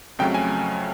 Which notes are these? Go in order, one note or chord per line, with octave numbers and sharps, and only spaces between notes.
F2 C#3 F#3 A3 G5
G#5